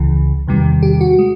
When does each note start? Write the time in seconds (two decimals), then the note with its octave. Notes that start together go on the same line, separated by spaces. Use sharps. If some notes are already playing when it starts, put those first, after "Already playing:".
Already playing: C#2 C#3 E3
0.47 E2 C3 D#3 G3
0.83 G4
1.01 F#4
1.19 G#3